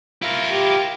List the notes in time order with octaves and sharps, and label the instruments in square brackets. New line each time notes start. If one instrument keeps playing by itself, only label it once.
[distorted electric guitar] E4 A#4 [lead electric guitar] F4
[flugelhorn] G4